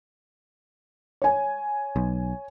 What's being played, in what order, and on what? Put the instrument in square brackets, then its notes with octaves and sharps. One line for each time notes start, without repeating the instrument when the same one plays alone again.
[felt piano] C#5 G#5
[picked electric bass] B1